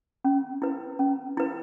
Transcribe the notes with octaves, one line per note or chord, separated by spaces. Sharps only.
C#4
E4 B4
C#4
E4 B4